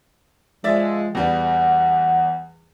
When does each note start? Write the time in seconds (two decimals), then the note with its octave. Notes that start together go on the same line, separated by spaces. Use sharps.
0.64 F3 G#3 D5 E5 A6
1.15 E2 G3 B3 F#5